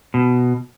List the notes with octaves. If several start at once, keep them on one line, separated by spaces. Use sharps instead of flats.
B2